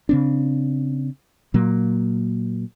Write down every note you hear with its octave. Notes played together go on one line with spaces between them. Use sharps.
C#3 C4 D4
A#2 F#3 A#3